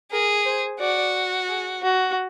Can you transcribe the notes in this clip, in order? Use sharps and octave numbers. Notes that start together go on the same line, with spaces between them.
G#4 A#4
C5
F#4 D5
G#4
F#4